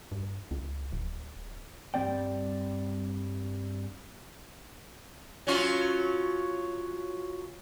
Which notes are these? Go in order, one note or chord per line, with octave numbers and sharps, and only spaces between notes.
G2
C#2
D1
G2 G3 G#3 C4 D5 G5
F#3 C#4 F4